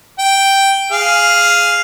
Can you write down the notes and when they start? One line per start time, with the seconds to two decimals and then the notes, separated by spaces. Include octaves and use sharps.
0.19 G5
0.91 G#4 F5